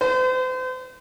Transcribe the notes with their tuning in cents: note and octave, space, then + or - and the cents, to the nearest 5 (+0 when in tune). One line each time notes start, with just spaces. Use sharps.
C5 -40